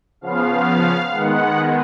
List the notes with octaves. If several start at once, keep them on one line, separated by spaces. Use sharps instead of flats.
C#3 F3 B3 F5
D#3 G#3 B3 F#5